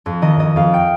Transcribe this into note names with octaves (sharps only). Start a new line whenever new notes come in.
F2
D#3 D#5
F2 D#5
F2 F5
G5